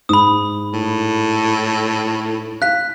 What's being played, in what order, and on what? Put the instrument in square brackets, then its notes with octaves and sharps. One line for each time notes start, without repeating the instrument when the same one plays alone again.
[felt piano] G#2 [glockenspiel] B5 D#6
[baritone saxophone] A2
[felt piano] F5 [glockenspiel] F#6 B6